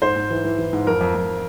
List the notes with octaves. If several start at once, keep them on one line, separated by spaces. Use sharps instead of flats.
G#2 C5
G#2
E3
E3
E3
G#2
F2 A#4
F2
F2